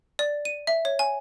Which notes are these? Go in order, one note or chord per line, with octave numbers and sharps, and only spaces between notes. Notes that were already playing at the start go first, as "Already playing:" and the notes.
D5
D#7
E5
C#5
G#5